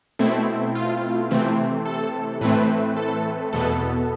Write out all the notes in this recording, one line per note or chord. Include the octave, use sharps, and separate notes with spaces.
B2 A3 C4 E4
F4
C3 E3 A3 C4
A4
A2 E3 A3 C4 B4
A4
E2 B2 B3 A4